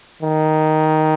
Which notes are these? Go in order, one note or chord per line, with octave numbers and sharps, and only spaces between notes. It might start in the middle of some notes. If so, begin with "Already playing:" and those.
D#3